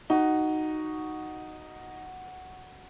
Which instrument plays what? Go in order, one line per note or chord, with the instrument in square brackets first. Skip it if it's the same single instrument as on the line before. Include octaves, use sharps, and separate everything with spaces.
[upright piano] D#4 [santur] F#4